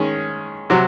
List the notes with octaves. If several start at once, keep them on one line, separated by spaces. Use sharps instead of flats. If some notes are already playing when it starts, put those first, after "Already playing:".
Already playing: D#3 G#3 C#4 G#4
C3 F#3